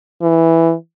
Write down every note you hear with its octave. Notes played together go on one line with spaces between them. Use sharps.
E3